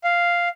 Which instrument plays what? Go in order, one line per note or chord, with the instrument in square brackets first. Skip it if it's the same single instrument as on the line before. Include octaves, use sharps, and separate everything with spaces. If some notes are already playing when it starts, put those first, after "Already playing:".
[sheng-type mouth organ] F5